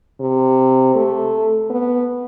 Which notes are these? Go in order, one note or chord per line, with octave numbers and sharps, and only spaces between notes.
C3
A3
B3